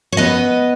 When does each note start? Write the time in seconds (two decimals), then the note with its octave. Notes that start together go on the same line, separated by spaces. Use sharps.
0.12 C#5
0.17 B3 B4 D#5